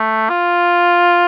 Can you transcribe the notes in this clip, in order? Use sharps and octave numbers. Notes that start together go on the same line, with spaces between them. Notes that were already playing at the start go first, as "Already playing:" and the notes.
Already playing: A3
F4